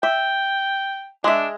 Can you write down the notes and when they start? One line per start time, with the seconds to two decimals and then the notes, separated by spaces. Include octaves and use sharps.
0.03 E5 G5
1.24 G#3 D4 E5